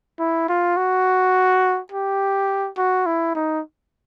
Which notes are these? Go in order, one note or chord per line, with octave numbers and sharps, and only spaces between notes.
E4
F4
F#4
G4
F#4
E4
D#4